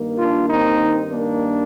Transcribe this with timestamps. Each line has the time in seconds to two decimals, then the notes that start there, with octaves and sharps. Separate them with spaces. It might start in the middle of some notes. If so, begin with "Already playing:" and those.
Already playing: G2 D#3 A#3
0.19 D4 F4
0.49 C4 D#4
1.11 A#3 D4